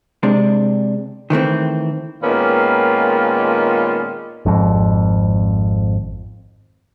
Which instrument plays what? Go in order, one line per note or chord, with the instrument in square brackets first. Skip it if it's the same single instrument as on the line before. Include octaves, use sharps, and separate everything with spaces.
[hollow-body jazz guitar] C3 G#3 D4
D#3 E3 A3 C4
[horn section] A#2 D#3 G#3 B3 C#4 F4
[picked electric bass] G#1 F2